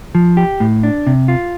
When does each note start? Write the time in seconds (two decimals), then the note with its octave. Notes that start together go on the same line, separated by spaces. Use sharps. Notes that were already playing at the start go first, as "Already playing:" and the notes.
0.15 F3
0.37 G4
0.60 A2
0.83 D4
1.07 C3
1.28 F4